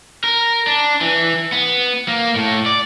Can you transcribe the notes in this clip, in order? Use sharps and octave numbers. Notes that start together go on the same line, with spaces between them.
A#4
D4
E3
B3
A#3
A2
D5